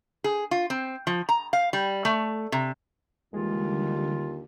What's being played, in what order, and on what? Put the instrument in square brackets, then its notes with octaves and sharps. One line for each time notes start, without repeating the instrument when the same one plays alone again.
[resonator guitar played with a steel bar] G#4
F4
C4
F3
A#5
F5
G3
A3
C3
[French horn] D#2 [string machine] D3 G3 [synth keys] E3 G#3 [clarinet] F4